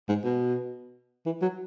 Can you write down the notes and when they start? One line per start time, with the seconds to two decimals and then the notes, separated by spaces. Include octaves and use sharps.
0.09 G#2
0.24 B2
1.26 E3
1.42 F#3